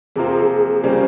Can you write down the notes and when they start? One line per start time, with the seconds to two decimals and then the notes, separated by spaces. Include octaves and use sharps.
0.16 F2 C3 F3 A#3 F4 G#4
0.83 C#3 G3 A#3 C#4 C5